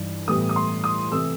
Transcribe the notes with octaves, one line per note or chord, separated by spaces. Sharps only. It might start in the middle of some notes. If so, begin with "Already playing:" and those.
Already playing: G2 E3 G3 D#4
A2 E3 G3 B3 D#6
D#6
C6
D#6
C3 E3 A3 E6